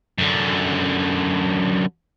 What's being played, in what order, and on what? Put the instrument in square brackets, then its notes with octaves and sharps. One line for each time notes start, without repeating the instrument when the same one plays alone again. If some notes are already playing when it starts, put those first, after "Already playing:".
[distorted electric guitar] F#2 D3